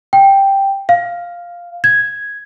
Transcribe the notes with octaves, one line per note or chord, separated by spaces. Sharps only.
G5
F5
G#6